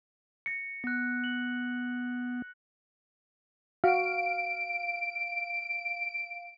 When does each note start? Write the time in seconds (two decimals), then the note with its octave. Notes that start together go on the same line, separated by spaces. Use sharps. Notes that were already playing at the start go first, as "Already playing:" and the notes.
0.46 A#6 C#7
0.84 B3 F#6 A#6
1.24 F#7
3.84 F#4 F5 D7